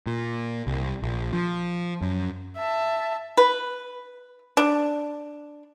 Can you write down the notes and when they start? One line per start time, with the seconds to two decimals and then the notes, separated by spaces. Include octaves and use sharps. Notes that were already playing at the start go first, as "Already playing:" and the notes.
0.07 A#2
0.67 C2
1.02 A#1
1.33 F3
2.02 F#2
2.57 E5 A5
3.37 B4
4.57 D4